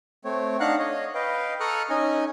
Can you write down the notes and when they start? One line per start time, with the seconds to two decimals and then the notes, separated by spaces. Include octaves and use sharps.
0.25 A3 C4 C#5
0.60 D4 D#4 F5 F#5 A#5 F#6
0.79 C#5 D#5
1.15 B4 D#5 F5 G5
1.60 A4 A#5 C#6 D#6 F6 F#6
1.90 C#4 D#4 D#5 G#5